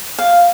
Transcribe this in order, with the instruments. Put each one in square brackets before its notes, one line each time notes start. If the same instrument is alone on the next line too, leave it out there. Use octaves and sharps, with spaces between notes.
[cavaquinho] F5